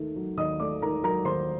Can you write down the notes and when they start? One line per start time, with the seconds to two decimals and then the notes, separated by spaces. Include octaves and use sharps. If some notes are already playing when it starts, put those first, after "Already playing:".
Already playing: D#2 D#3 A3
0.16 F#3
0.37 D#2 D#5 D#6
0.60 A3 D5 D6
0.82 D#3 A#4 A#5
1.03 F#3 A#4 A#5
1.25 D#2 C5 C6